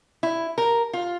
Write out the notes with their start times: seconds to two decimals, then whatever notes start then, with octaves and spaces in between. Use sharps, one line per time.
0.23 E4
0.58 A#4
0.93 F4